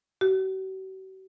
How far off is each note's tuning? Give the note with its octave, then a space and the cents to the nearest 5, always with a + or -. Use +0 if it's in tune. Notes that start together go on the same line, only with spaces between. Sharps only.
F#4 +45